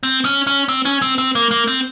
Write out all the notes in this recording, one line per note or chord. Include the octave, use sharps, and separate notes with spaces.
C4
C#4
C#4
C4
C#4
C4
C4
A#3
A#3
C4